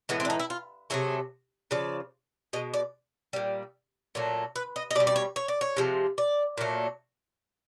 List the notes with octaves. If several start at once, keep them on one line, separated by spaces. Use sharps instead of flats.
A2 E3 G#3 B3
C4
D4
D#4
E4
F4
C3 D#3 F#3 A3 G#4
C#3 F3 D5
B2 G#3 D#5
D5
A#2 G3
A#2 F#3 A3
B4
D#5
D#5
B2 G3 D5
D5
C#5
C#5
D5
C#5
C3 F3 G#3
D5
A#2 F#3 A3